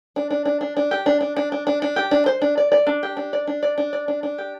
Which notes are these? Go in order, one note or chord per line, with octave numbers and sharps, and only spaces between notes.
D4
D4
D4
D4
D4
G4
D4
D4
D4
D4
D4
D4
G4
D4
C5
D4
D5
D5
D4
G4
D4
D5
D4
D5
D4
D5
D4
D4
G4